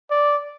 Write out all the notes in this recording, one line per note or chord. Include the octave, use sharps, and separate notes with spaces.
D5